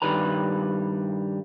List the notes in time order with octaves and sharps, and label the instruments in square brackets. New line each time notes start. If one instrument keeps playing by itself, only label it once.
[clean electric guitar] G2 D#3 G3 B4 A#5